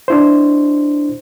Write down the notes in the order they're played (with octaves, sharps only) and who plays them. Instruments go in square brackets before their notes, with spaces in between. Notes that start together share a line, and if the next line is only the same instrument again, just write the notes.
[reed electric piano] D4 E4 C5